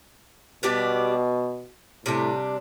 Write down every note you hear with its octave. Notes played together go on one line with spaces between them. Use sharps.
B2 G3 B3 D4 G4
A2 C3 G3 D4